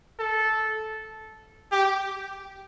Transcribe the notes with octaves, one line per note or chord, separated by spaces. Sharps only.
A4
G4